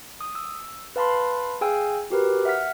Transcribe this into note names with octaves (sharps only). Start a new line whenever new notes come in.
D#6
E6
B4 F5 A5 B5 C6
G#4 F5 G5 G#5 E6
F#4 G4 A#4 B4
E5 F#5 F6 B6